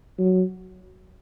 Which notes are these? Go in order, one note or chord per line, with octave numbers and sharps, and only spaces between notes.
F#3